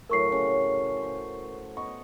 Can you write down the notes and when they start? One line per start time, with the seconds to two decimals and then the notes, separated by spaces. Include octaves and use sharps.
0.10 A2 F#3 A3 A#4 C#6 C7
0.32 C#3
1.02 C5
1.77 B3 D#5 C#6